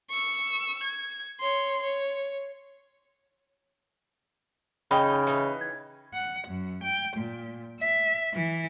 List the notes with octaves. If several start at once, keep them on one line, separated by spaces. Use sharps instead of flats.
C#6 E6
G#6
C#5 C6
C#5
C#3 D#4 G5 B5
E3 D#4
G#6
F#5
F#2
G5
A#2
E5
E3